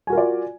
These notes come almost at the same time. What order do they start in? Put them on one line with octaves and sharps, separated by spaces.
G#5 F#4 A#4 F4 D5